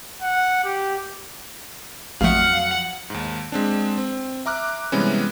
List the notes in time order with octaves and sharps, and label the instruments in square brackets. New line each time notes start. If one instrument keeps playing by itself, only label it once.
[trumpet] F#5
G4
[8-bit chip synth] A1 A3 [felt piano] F2 F#3 D#6 [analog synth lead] F5 [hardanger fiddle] F#5
[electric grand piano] D#2 G#2
G#3 C4 D4
C4
E5 A#5 D6 F6 F#6
C3 E3 G3 G#3 B3 C#4